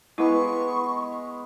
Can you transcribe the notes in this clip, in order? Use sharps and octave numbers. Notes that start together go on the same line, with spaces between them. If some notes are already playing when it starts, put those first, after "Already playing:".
G#3 B3 E4 C#6